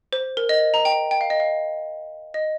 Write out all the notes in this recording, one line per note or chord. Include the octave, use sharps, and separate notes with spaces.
C5
A#4
D#5
A#5
G5
G5
F5
D#5
F5
D#5